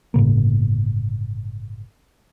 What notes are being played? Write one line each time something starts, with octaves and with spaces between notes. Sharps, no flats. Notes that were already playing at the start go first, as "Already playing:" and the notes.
G1 A2 C#3 A#3